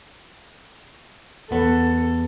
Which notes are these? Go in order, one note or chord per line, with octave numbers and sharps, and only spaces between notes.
E2 B3 A4